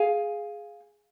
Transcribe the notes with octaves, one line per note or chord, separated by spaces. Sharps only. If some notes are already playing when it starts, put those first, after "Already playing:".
Already playing: G#4 F5 G#5